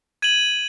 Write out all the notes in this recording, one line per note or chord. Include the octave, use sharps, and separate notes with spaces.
G#6 D#7 F#7